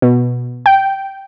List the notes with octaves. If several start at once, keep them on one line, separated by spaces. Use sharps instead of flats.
B2
G5